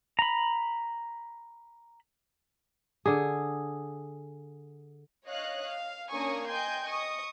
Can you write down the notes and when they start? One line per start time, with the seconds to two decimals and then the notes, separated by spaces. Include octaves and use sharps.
0.19 A#5 B5
3.06 D3 G#4
5.26 C#5 D#5 F5 F#6
5.66 F5
6.12 A#3 C#4 D4 G#5 C#6 D#6
6.48 D#5 G5 G#5 C6 G6
6.86 D#5 C#6 D#6